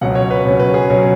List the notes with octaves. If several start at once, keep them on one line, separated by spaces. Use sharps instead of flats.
C#2 B2 F#3 C#4 F#5
C#5
B4
C#2 B2 F#3 C#4
B4
G#4
B2 F#3 C#4